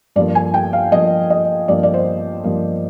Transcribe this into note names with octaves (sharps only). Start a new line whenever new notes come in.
G2 F3 A#3 D5
G#5
G5
F5
G2 F3 A#3 D#5
D#5
G2 F3 A#3 D5
D5
C5
G2 F3 A#3